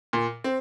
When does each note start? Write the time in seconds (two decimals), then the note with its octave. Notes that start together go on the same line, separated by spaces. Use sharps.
0.13 A#2
0.44 C4